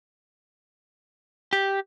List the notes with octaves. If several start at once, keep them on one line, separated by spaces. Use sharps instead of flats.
G4